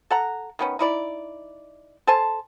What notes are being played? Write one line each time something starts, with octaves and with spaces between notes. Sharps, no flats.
A4 F#5 A#5
D#3 B3 C#4
D#4 E4 D5
A4 C5 G#5 A5